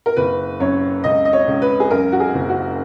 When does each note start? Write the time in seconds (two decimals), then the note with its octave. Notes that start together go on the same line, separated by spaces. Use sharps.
0.06 A#4
0.16 F#1 B4
0.60 F#2 C#5
1.04 C#2 D#5
1.25 D#5
1.33 C#5
1.47 C#2
1.62 B4
1.80 G#4
1.91 F#2 A#4
2.12 F#4
2.20 G#4
2.34 F#1
2.49 F#4